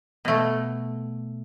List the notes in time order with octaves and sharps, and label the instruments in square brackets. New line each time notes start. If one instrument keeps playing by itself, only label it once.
[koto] B2 A3